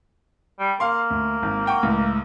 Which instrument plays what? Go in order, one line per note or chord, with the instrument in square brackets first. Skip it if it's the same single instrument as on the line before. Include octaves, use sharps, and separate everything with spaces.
[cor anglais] G3
[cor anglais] A#3 [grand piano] F5 C6
[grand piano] D2
G#1
F#5 G5 C#6
C#2 A2